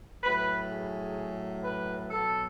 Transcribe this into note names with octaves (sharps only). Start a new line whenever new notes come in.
A2 F#3 B4
G#4
B4
B2 F#3 A4